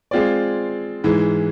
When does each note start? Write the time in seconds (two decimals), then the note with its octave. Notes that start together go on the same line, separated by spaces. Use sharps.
0.11 G#3 C4 F4 G#4 D5
1.04 G#2 E3 G#3